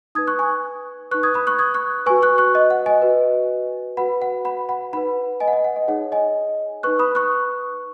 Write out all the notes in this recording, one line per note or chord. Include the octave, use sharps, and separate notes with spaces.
D#4 B4 D#6 G#6
C#6 F#6
G#5 C#6
D#4 B4 C#6 F#6
D#6 G#6
B5 D#6
C#6 F#6
D#6 G#6
C#6 F#6
F#4 B4 G#5 C#6
C#6 F#6
C#6 F#6
D#5
F#5
D#5 G#5
F#4 B4
F#4 B4 F#5 B5
F#5
F#5 B5
F#5 B5
D#4 B4 F#5 B5
D#5 G#5
F#5
D#5
F#5
D#5
D#4 G#4 C#5 F#5
D#5 G#5
D#4 B4 C#6 F#6
B5 D#6
C#6 F#6